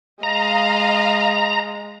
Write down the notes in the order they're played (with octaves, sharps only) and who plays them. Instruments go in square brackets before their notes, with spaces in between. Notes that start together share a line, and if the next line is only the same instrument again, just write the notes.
[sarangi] G#3 [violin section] D#5 F5 [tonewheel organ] A#5